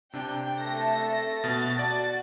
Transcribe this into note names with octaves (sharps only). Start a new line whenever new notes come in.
C3 D4 G5
A3 A4 A#6
B2 F#4 A6
D5 F#5 A5